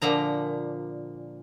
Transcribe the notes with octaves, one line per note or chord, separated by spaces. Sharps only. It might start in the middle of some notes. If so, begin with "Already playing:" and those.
A#2 D3 F3 A#5